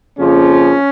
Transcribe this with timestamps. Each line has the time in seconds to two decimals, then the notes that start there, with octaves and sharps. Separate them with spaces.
0.18 F2 C#3 F3 A#3 C#4